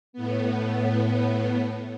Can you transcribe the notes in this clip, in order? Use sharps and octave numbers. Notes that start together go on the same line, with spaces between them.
A2 B3